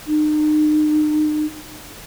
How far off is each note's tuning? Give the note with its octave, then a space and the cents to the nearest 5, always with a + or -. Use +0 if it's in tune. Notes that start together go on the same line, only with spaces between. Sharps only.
D#4 -40